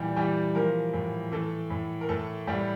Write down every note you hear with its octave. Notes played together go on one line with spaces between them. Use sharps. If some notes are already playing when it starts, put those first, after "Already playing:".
Already playing: A#2 E3 G3 G4
E3 G3 G4
F3 A#3 A#4
A2
E3 A3 A4
A2
A#4
A2 A3 A4
A2 G3 G4